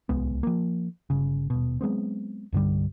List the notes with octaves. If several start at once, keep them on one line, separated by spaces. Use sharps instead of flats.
D1 C2 G#3 B3
F3 A#3
G1 C#3
D#1 B2
F#3 G#3 B3 C4
C2 G2 D3 G3